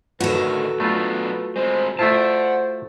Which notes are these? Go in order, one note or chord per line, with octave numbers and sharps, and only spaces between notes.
A2 D3 D#3 F#4 A4 B4
F#3 A3 B3 D4 F4
G#3 C4 C5
A3 E4 F4 C5 F#5 A5